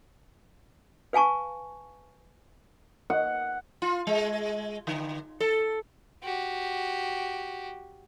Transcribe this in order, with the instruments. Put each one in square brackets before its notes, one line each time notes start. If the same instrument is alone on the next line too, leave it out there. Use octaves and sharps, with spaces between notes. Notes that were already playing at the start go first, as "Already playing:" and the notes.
[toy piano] B4 F5 G#5 A5 C#6
[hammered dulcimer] F#5
[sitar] F4
G#3
D3
A4
[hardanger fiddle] F#4 G4